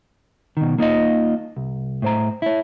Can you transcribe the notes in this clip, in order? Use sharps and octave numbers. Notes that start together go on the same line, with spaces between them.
B2 D#3
A#3 D#4 F4 D#5
C2
A2 C5 A#5
E4 C#5